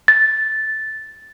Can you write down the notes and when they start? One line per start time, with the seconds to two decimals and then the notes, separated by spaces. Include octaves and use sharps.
0.08 A6